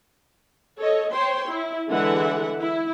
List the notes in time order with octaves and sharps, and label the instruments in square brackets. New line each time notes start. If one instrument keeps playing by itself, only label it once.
[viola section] A4 C#5 D#5
C5 C#5 G5 C6
E4
D3 E3 G#3 A4 E5 F#5
E4